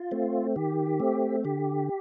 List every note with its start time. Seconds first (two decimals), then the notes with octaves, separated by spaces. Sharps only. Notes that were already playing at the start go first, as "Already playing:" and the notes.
Already playing: F4
0.11 A3 C4
0.56 D#3 G4
1.00 A3 C4
1.45 D3 G4